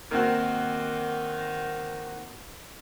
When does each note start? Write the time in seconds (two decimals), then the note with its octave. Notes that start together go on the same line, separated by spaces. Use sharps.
0.11 D#3 A#3 C4 F#4